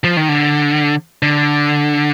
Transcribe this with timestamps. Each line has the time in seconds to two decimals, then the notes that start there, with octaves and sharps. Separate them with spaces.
0.04 F3
0.17 D#3
0.29 D3
1.22 D3